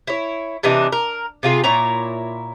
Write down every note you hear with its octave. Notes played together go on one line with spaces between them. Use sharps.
E4 C#5
C3 E3 D4 D#4
A#4
C3 F4 G#4
A#2 E4 C#5 A#5